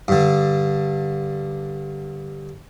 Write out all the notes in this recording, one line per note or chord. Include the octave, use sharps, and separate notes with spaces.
G2 D3